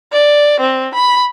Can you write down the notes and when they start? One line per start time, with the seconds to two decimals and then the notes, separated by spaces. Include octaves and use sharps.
0.12 D5
0.60 C4
0.95 B5